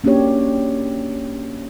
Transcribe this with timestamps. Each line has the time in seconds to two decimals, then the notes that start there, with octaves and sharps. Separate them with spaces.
0.04 A#3 C#4 D4 F#4 G4 C#5